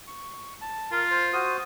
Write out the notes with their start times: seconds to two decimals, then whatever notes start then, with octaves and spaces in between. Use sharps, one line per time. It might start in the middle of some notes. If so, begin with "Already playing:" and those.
0.07 C#6
0.61 A5
0.91 F4 A#4
1.11 C5
1.33 F#4 C5 D#6